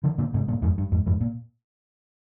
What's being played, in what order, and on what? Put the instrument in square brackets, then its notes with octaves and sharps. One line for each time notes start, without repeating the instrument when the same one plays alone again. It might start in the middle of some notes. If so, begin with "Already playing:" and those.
[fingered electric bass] D3 F3
A#2 D3
G#2 C3
G2 A#2
F2 G#2
G2
F2 G#2
F2 G#2
A#2